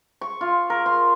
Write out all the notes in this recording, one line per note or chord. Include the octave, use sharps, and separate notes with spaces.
C#6
F4
A#4
C6